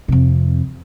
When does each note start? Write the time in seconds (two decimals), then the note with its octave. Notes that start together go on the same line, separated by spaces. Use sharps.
0.08 F2 C3